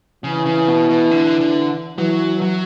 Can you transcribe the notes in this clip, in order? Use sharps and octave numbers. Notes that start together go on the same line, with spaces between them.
C#3 E3
C#3
B2
B2
D3
D3
E3 F#3
F#3